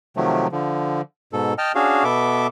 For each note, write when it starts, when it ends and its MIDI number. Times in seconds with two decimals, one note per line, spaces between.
0.17 0.47 48
0.17 0.47 51
0.17 0.47 53
0.17 0.47 54
0.17 0.47 57
0.52 1.01 50
0.52 1.01 53
1.33 1.54 44
1.33 1.54 47
1.33 1.54 69
1.58 1.72 75
1.58 1.72 79
1.58 1.72 81
1.58 1.72 89
1.75 2.04 61
1.75 2.04 62
1.75 2.04 66
1.75 2.04 68
1.75 2.04 77
2.04 2.47 47
2.04 2.47 59
2.04 2.47 69
2.04 2.47 76
2.04 2.47 86